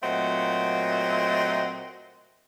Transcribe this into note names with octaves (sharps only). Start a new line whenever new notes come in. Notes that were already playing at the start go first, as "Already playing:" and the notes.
A#2 F#3 A3 C4 D#5 F#5